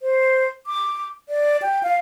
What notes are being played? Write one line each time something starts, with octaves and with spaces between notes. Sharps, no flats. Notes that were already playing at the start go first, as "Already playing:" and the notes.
C5
D6
D5
G5
F5